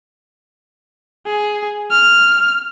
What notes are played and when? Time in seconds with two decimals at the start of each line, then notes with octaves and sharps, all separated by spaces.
1.27 G#4
1.91 F6